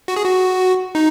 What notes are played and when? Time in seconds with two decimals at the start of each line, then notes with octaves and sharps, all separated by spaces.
0.08 F#4
0.16 G#4
0.25 F#4
0.95 D#4